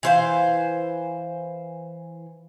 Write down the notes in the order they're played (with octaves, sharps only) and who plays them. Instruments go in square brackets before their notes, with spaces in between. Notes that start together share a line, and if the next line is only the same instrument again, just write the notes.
[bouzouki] E3 C5 F5